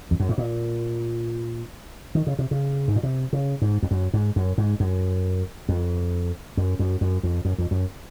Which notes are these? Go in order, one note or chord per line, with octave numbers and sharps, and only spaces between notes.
F2
F#2
G#2
A#2
D#3
C#3
C3
C#3
G#2
A#2
C3
C#3
G#2
F2
F#2
G#2
F#2
G#2
F#2
F2
F#2
F#2
F#2
F2
F#2
F2
F#2